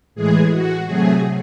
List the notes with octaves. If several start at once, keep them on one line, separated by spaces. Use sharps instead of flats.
A2 E3 G#3 G#4
F#4
C3 F#3 A3 G#4